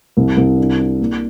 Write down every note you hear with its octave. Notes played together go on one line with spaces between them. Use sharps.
C2
C2
D4
D4
A#3